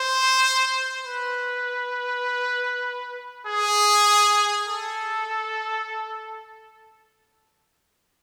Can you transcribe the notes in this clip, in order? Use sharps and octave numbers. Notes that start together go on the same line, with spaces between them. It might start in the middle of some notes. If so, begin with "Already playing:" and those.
Already playing: C5
B4
G#4
A4